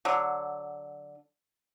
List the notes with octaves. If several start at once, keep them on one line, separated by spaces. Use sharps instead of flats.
D3 F#3